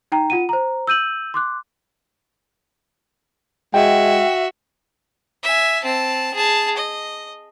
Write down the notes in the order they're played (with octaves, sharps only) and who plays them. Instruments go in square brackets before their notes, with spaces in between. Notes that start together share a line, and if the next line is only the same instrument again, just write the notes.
[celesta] D#4 G5 A#5
F4 F#5 D#7
C5 A#5
E6 G6 D#7 F#7
C6 D6 F#6
[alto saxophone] G#3 [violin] F#4 E5 [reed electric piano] G5
[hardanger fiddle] E5 G#5
C4 A5
G#4 A5
D#5